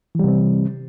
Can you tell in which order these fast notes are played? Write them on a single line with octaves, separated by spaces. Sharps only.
E3 G3 C3 C4